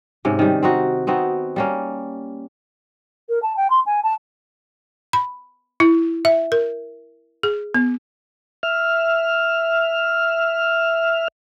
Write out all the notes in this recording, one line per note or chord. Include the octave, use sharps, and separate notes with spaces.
G#2 C3 C#4
D#3 G3
C4 D#4 F#4
B3 C4 D#4 F#4
G3 A#3 C#4
A#4
A5
G5
C6
G#5
A5
B5
E4
E5
A#4
G#4
B3
E5 F6